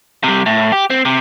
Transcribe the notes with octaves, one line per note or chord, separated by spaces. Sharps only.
C3 G3
A2
G4
C4
C3